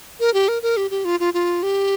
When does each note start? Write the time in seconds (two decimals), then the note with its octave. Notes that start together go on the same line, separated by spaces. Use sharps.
0.20 A#4
0.34 G4
0.48 A#4
0.62 A#4
0.77 G4
0.91 G4
1.05 F4
1.20 F4
1.34 F4
1.63 G4